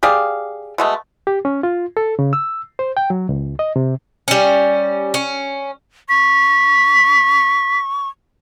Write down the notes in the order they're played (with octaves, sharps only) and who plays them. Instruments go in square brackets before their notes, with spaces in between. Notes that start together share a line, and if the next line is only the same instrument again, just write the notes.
[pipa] G4 G#4 D5 F5
B2 G#3 A3
[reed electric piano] G4
C#4
F4
A4
C#3
E6
C5
G5
F#3
C#2
D#5
C3
[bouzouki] G3 C#4
C#4
[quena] C#6 [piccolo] B6